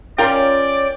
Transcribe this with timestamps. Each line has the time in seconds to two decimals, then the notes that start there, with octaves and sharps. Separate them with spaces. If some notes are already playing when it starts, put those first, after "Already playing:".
0.18 C#4 F4 A#4 D5 G5